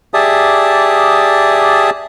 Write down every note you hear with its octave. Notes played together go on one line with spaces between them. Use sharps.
G4 G#4 D5 E5 A5 D#6